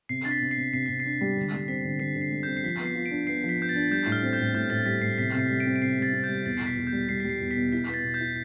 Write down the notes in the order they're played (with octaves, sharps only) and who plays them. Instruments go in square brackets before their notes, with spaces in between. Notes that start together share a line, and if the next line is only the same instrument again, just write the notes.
[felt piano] C3 [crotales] C7
[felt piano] D4 [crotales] A6
[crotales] B6
[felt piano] C3
[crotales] C7
[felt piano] C3
[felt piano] C3 [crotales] C7
[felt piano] C3 [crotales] B6
[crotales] C7
[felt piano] D4
G3
D3
G3
[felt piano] C4 [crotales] B6
[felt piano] D3
[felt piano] D3 [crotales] C7
[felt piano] D3
[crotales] C7
[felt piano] G3
[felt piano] C4 [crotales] G6
[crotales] C7
[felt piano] F3 [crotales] B6
[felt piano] B3
[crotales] C7
[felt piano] F4
[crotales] D7
[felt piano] D4
[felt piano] B3 [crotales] C7
[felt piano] F3
[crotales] B6
[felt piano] B3 [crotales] G6
[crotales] A6
[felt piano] D4
[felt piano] G3 [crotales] G6
[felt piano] A2
[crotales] F6
[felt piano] C4
[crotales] G6
[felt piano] A2
[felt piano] A2 [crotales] G6
[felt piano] A2 [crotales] A6
[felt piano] G3 [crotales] B6
[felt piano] A2 [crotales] C7
[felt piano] C3 [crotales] B6
[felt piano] C3
[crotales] C7
[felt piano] G3
[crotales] D7
[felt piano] C4
[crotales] D7
[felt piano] C3 [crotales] C7
[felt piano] G3 [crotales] A6
[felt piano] C4
[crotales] G6
[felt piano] G3
[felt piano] E2 [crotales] A6
[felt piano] B2 [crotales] C7
[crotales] B6
[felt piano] E2
[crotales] G6
[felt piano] G3
[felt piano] G3 [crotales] C7
[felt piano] G3 [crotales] B6
[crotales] C7
[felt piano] E2
[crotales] B6
[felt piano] B2
[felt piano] E4 [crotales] B6
[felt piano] B3 [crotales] B6
[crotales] A6
[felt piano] B2
[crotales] G6
[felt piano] E4